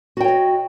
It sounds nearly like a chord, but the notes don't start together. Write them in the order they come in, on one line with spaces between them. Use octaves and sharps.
F#4 G5 C#5 D#5